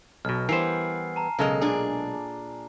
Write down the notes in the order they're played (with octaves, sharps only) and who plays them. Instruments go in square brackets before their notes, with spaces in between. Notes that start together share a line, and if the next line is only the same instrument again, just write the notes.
[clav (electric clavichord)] B1 B2 [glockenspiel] F6
[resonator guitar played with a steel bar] E3 G3 B3 [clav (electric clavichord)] A#4 C5 [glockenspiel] G#5 C7
[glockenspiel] A5 A#5
[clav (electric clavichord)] B1 G#3 A#4 [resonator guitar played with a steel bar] C#3 A4 D#5
[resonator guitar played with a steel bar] A#2 D4 G#4